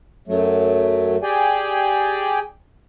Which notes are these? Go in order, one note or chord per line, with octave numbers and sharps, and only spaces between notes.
F#2 F#3 A3
G4 G#4 D5 G5 G#5